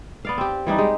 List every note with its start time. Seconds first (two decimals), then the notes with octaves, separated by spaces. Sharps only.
0.25 B3 D5 F5
0.38 C4 G4
0.67 E3 G3 D4 D#4
0.78 G#3 G4